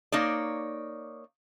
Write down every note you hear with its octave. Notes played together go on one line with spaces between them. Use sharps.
A#3 D#4 C#5 D5